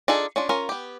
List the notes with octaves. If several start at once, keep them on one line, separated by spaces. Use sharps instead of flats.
D4 D#4 F4 G#4 A4
C#4 D4 F4
C#4 F4 A#4
B3 G4